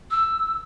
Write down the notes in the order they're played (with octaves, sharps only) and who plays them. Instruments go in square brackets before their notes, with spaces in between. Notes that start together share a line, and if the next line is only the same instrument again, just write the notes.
[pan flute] E6